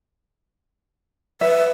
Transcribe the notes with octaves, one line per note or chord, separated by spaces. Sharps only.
B4 E5